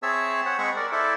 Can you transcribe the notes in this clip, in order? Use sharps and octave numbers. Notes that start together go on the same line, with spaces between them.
C4 G#4 C#5 E5 A5 E6
C5 C#5 F#5
G#3 C4 G#4 F#5 B5 C#6
A#4 D5
E4 A4 C5 D5 E5